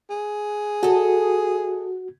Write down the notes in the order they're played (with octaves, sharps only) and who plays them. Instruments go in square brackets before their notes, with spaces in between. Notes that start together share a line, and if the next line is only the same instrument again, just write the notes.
[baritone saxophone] G#4
[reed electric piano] F#4 [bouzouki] A4 D#5